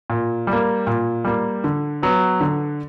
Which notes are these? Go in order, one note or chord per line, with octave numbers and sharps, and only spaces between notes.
A#2
G3
A#3
A#2
G3 A#3
D3
F#3 B3
D3